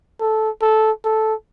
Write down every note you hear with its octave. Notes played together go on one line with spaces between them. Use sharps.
A4
A4
A4